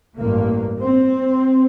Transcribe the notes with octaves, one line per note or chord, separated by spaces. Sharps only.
A1 G2 A#3
C4